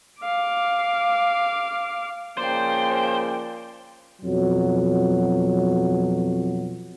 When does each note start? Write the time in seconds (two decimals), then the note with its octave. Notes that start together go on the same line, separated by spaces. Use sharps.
0.21 F5 D6
2.37 C#3 F3 A#3 C5 D5 G5
4.22 F2 B2 F#3